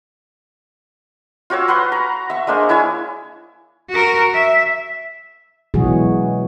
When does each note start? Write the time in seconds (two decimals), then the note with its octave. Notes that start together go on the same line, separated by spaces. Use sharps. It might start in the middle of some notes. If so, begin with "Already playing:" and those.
1.50 F4 F#4 C#5 E6
1.68 B4 F#5 C6 C#6
1.92 A#5
2.30 E5 C#6
2.47 G#3 A#3 D4 C5
2.69 E4 C#5 E5 G#5
3.90 F#4 A#4
4.34 E5
5.74 B2 E3 F#3 G#3 F#4 G#4